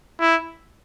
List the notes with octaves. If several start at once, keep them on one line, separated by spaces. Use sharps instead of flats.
E4